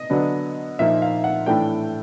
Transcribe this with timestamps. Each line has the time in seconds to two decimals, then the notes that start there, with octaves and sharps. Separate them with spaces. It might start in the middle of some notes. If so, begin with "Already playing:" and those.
Already playing: D#5
0.10 D3 F#3 B3 D4
0.79 A#2 F3 A#3 D#4 E5
1.02 F5
1.24 F#5
1.46 A2 E3 A3 D4 G5